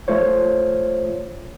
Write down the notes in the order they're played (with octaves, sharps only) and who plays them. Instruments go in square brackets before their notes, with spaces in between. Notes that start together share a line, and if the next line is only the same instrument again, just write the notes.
[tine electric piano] A3 F4 C5 C#5